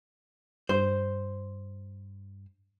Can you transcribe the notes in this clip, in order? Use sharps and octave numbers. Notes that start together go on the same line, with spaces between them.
G2 C5